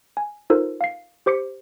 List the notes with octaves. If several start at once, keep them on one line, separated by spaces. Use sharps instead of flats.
G#5
D#4 F4 A4 A#4 C5
F5 C7
G4 C5 D6 B6 C#7